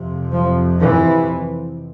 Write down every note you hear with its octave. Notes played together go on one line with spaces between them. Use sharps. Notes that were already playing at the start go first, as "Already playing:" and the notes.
Already playing: F2 C3
F3
E3